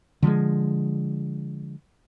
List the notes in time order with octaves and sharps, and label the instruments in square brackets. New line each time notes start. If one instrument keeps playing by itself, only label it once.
[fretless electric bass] D3 F3 G3 G#3